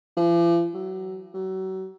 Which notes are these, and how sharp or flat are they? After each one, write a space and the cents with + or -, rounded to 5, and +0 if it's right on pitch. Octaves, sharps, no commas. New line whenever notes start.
F3 -45
F#3 +30
F#3 +35